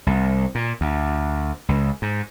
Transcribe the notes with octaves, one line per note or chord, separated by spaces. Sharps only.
C2
A#2
D2
C#2
G#2